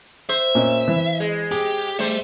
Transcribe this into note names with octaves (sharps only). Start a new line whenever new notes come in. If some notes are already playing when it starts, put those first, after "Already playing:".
C5 E5
A#2 C#4 D#5
E3
G#3
G4 G#4
G3 A3 C5